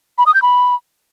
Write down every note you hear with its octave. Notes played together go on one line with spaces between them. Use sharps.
B5
D#6
G6
B5